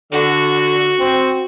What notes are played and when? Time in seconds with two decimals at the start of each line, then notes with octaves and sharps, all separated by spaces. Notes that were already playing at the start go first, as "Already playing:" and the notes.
0.12 D3 F#4
0.98 C4